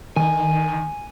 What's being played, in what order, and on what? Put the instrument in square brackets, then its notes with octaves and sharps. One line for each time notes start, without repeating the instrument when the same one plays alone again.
[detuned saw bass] D#3 [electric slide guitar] G#5